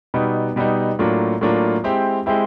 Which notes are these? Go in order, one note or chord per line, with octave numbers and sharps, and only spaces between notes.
B2 G3 B3 D#4
B2 G3 B3 D#4
A2 F#3 A#3 D4 F4
A2 F#3 A#3 D4 F4
G#3 C4 E4 G4
G#3 C4 E4 G4